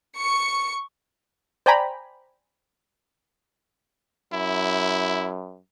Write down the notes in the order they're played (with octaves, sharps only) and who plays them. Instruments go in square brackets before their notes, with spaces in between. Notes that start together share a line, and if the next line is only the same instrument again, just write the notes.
[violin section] C#6 C#7
[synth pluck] C5 D5 G5 G#5 A#5 B5
[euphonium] F#2 [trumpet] E4